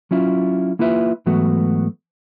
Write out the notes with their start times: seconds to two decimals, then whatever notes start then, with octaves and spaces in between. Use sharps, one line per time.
0.11 F#3 C#4 E4 F4
0.79 A#3 E4 F4 B4 E5
1.26 G#2 E3 F#3 A3 B3 F#4